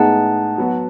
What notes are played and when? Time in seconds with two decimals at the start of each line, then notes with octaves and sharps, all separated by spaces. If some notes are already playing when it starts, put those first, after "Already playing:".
Already playing: A2 G#3 B3 D#4 G#4 F#5 A5
0.58 F#3 B3 F#4